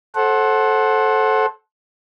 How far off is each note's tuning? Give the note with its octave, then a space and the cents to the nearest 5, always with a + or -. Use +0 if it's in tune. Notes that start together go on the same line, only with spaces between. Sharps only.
A4 -15 C5 +20 F#5 +0